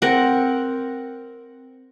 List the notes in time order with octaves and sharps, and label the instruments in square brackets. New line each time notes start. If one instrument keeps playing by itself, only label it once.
[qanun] C4 A#4 F#5